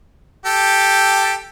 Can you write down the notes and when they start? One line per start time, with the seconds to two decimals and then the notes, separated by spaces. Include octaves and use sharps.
0.46 G4 A4